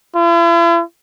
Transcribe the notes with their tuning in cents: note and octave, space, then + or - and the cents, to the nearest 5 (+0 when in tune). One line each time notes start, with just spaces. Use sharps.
E4 +45